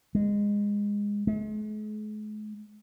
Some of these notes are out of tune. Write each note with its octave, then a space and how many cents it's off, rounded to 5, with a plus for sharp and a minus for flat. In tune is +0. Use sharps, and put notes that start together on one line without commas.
G#3 -20
G#3 +45